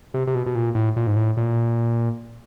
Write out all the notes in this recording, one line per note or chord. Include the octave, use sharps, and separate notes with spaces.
C3
C3
B2
B2
A#2
A2
A#2
G#2
A2
A#2